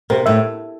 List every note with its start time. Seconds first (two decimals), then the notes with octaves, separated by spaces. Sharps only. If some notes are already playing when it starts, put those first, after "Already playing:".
0.10 C3 A#4
0.26 A2 E5